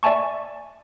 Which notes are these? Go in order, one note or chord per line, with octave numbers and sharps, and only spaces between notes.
D5 E5 G#5 A5 C#6